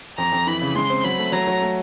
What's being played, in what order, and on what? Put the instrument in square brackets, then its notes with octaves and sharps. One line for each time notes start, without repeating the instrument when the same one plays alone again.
[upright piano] F2 [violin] A#5
[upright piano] F2
[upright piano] E3 [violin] B5
[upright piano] C#3
[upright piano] G#3 [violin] C6
[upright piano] C4
[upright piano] F#3 [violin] B5
[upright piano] A3
[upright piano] F#3 [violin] A#5
[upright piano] F#3
A3